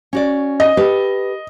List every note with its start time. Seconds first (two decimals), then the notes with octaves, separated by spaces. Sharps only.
0.13 C#4 F#4 D5
0.60 D#5
0.77 G4 A4 B4